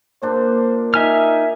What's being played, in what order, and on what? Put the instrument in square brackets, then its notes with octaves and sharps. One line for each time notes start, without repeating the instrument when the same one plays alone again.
[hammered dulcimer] A#2 A#3 D4 [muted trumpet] C5
[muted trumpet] D#4 [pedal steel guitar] E5 G#5 F6